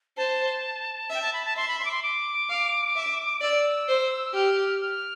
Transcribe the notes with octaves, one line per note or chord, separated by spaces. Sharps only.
C5 A5
E5 G5
A5
B5
A5
E5 C6
B5
C6
D6
C6
D6
F5
E5
D5 E6
C5
G4 F6
F6